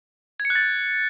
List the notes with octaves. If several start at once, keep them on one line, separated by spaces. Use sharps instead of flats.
G#6
C#7
F#6
A6